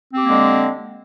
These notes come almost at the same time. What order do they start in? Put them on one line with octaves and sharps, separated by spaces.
C4 G4 A#3 G#3 D3